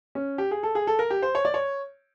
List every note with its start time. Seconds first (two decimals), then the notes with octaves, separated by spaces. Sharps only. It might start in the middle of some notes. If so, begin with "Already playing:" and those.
0.15 C#4
0.38 G4
0.51 G#4
0.63 A4
0.75 G#4
0.87 A4
0.99 A#4
1.10 G4
1.22 C5
1.35 C#5
1.45 D5
1.54 C#5